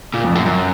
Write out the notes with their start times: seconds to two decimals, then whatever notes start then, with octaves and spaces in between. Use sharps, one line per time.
0.14 A#2
0.24 F2
0.35 F#2
0.46 F#2